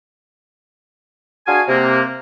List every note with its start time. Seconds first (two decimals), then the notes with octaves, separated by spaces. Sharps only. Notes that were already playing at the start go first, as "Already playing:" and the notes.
1.47 D4 F#4 G#4 F5 G#5
1.68 C3 A#3